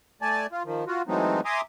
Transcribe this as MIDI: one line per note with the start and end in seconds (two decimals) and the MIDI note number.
0.22 0.46 57
0.22 0.46 74
0.22 0.46 80
0.22 0.46 81
0.52 0.63 65
0.65 0.84 51
0.65 0.84 53
0.87 1.02 65
0.87 1.02 66
1.08 1.41 52
1.08 1.41 54
1.08 1.41 56
1.08 1.41 57
1.08 1.41 60
1.08 1.41 63
1.45 1.61 76
1.45 1.61 80
1.45 1.61 82
1.45 1.61 84
1.45 1.61 86
1.45 1.61 87